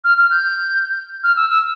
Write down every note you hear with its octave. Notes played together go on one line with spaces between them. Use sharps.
F6
F6
G6
F6
E6
E6